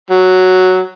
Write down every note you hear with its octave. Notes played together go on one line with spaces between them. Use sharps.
F#3